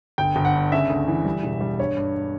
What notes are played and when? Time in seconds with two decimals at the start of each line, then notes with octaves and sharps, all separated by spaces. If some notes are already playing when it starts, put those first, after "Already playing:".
0.18 G1 G5
0.36 G1
0.45 F#5
0.54 G2
0.72 C#3 E5
0.90 D2
1.08 E3
1.25 G3
1.43 E1
1.61 G3
1.80 G2 C#5
1.97 G2